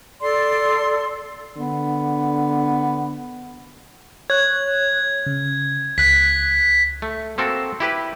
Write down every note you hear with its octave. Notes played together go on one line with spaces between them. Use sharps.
A4 D5 C6
D3 B3
C#5 F#6 G#6
C#3
C#2 F#6 B6
A3
A#3 C4 F#4 A4 A#4
E4 G4 B4